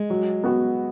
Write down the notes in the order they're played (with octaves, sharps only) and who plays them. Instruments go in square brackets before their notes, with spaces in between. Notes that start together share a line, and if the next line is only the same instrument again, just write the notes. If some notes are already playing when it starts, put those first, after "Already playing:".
Already playing: [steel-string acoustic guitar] G#3
[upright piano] F#3
B3 F#4